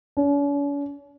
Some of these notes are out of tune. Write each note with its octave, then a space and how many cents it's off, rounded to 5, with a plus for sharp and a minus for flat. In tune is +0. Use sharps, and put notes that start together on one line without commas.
C#4 +45